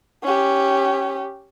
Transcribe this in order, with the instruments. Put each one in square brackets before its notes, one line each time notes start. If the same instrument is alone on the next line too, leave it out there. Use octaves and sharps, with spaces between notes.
[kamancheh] C#4 G4